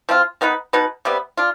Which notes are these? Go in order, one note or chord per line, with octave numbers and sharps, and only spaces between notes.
F3 C4 F4
D#3 B3 D#4 B4
B2 B3 D#4 B4
C3 G3 B3
D4 F4